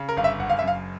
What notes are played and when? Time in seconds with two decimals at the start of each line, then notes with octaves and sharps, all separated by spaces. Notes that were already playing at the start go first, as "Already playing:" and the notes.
Already playing: C#3
0.09 A#4
0.17 G1 F5
0.24 E5
0.39 F#1 F#5
0.50 F5
0.59 F#2 E5
0.68 F5